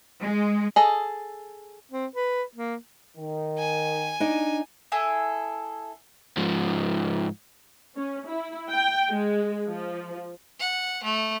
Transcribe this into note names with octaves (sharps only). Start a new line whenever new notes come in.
G#3
G#4 A4 D#5
C4
B4
A#3
D#3
G#5
D4 D#4
E4 G#4 A4
G#2 F3
C#4
E4
G5
G#3
F3
F#5
A3